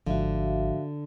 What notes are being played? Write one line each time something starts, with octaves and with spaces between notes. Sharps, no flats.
G#1 G#2 D3 F3 F#4 E5 F5